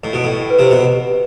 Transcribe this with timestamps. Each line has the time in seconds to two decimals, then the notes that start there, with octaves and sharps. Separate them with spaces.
0.03 A2 D#5
0.13 B2
0.24 A2 G5
0.50 B4
0.59 C3
0.71 B2